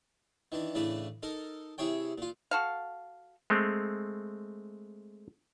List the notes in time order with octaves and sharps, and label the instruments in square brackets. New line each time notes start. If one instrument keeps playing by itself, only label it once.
[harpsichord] D#3 E3 D4
A2 C#3 E3 D4 B4
D#4 A4 A#4
C3 E4 G#4 C#5 G5
A#2 F4
[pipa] F#4 A4 F5
[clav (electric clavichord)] G#3 A3 C4